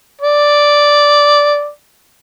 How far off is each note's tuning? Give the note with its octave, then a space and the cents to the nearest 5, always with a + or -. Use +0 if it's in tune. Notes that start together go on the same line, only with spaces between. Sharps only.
D5 -5